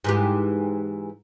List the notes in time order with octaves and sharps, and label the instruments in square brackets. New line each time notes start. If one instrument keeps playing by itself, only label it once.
[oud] G#2 E3 G4